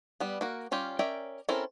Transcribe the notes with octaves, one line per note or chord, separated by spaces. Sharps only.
G3 B3
A#3 F#4 A#4
G3 C#4 F4 G4
C#4 A#4 D5 E5 G5
C4 C#4 E4 A4 A#4